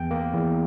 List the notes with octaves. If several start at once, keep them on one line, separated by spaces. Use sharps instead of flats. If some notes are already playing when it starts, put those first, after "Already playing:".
Already playing: E2 G5
A#3
E2